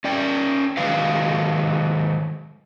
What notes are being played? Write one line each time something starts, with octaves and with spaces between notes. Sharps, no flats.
C#4 D5 G5
D#3 F#3 G#3 B4 F5